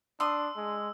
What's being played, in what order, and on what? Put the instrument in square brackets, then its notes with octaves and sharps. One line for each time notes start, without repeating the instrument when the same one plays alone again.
[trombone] D4 [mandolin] C6 D#6 [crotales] E6
[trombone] G#3